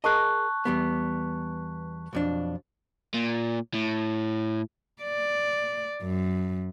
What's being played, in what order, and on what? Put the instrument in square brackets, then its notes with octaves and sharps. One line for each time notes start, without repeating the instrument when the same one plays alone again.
[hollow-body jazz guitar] G#4 A#4 D#5 [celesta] A5 C#6 F#6
[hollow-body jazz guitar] E2 G3 B3
B1 F2 D4
[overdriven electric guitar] A#2
A2
[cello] D5
F#2